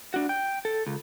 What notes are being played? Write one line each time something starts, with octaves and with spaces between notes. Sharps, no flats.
D4 F#4
G5
A4
C#2